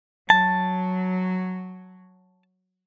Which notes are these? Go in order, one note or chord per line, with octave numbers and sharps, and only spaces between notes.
F#3 A5